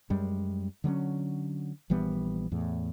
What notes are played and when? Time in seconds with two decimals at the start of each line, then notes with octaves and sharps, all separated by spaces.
0.10 F#2 G3 G#3
0.84 D3 F#3 A#3 C#4
1.90 A#1 E3 G3 B3
2.52 E2 A2